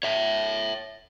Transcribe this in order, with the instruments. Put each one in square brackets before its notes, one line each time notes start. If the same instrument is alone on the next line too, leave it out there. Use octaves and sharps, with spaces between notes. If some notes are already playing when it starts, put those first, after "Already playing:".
[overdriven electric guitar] C#5 E5